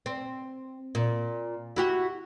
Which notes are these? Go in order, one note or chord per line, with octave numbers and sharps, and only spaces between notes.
C4
A#2
E4 F#4 G4